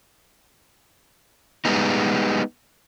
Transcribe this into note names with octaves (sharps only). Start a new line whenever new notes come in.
G3 G#3 B3 D#4